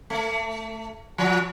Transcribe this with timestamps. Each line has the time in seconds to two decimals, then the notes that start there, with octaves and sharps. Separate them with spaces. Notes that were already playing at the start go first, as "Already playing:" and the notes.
0.10 A3
1.18 F3